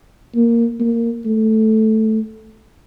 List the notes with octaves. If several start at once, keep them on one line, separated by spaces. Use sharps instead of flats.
A#3
A#3
A3